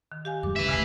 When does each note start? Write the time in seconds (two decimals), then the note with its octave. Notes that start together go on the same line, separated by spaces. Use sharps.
0.12 D#3
0.25 G4 F5 G#5
0.43 F#2 F#3 G#3 D6
0.56 B1 C#3 B4 E5
0.69 D#1 C#3 G#3 A3